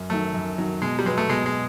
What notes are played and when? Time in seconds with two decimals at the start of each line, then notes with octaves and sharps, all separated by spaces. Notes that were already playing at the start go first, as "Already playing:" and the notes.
Already playing: F#2
0.10 D#3 F#3 A3
0.34 F#2
0.58 D#3 F#3
0.82 B2 G#3
0.99 G3
1.06 F#3 G#3 B3
1.18 A3
1.29 B2 G#3
1.46 G#3